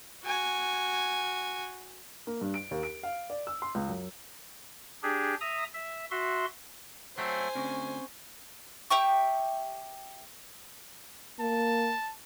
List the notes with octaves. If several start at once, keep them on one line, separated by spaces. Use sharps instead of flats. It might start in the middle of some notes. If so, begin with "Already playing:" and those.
F#4 G#5
A#3
G2
D7
D#2
D7
F5
D5
E6
C6
C#2
F#2
D4 G4 G#4
E5 A#5 D#6
E5
F#4 E5 C6
F#3 A3 C4 C5 G#5
D2 C4 C#4 C#6
G4 E5 G5 C#6
A#3 A5